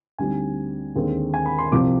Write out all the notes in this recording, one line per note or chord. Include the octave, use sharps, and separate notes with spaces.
D2 D3 G3 C4 D#4 G#5
D#2 D3 G#3 C4
G#5
B5
C6
C2 C3 F3 C4 D6